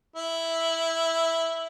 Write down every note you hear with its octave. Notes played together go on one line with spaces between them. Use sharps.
E4